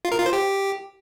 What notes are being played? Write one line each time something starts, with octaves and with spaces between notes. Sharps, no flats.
F4
A#4
F4
C5
G4